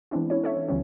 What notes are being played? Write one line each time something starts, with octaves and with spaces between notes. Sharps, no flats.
E3 G#3 B3 C4 D4 E4
C#4 E4 C#5
A4 C#5 E5
E3
D2 D3 F3 G3 B3 C#4